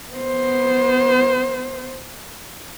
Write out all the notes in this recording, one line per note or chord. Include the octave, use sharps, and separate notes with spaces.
B3 C5